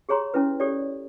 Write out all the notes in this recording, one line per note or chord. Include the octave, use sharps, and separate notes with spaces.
G4 G#4 C#5 A#5 C6
C#4 E4 B4
G4 A4 C#5 D5